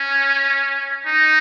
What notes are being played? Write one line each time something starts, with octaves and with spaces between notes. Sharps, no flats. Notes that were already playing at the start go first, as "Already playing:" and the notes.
Already playing: C#4
D#4